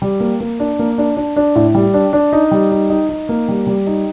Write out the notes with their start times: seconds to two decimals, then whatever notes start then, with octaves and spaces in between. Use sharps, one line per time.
0.02 G3
0.20 A#3
0.40 A#3
0.60 D4
0.79 A#3
0.98 D4
1.17 D4
1.36 D4
1.55 A2
1.75 G3
1.94 D4
2.13 D4
2.33 D#4
2.51 G3
2.71 D#4
2.90 D#4
3.09 D#4
3.29 A#3
3.48 G3
3.67 G3
3.87 D#4